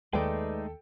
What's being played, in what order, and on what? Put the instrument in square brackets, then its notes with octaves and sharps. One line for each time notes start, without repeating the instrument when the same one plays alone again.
[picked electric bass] D#2 [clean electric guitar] G#3 A3 D#4 [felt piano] A4 G5 [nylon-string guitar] B4 D5